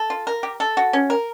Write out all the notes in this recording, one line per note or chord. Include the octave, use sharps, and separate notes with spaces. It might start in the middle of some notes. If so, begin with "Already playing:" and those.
Already playing: A4
F4
A#4
G4
A4
F#4
C#4
A#4